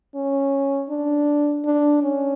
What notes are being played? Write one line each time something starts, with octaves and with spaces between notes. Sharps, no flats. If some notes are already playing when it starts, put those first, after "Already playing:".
C#4
D4
D4
C#4